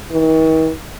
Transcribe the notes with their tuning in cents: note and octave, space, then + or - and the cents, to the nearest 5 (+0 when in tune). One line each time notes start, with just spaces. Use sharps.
D#3 +45